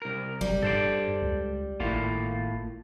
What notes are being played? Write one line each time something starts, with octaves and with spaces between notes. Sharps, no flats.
C2 A#4
F#1 G3
G2 A4 C5 D5
C#2
G#1 A2 A#3 F4